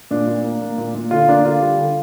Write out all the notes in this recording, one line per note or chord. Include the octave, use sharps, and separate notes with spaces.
A#2 D4
A#2
A#3
A#3
A#2
A#2
D3 F4
A#3 D4
D3 F4
G3
D3